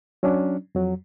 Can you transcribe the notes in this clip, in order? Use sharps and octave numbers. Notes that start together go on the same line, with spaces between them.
F#3 C#4 D4
F2 F#3